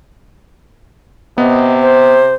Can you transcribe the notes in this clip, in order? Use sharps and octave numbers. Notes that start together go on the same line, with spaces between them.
C3 B3 D#5
C5